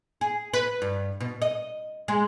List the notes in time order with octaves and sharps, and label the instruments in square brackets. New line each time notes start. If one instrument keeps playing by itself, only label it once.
[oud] G#4
B4
G2
B2
D#5
G#3